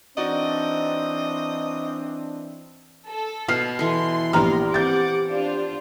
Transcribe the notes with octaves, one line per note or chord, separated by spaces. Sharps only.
E3 C4 D4 D#4 F#4 D5 D#5
A4
B2 F6 C7
E3 A4 C6
A#1 B3 G4 A#4 A#5 F6
C4 F#5 D6 G6 A6
D4 F4 C5